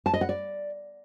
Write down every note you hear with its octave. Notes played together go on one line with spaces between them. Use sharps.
A5
D#5
F#5
D5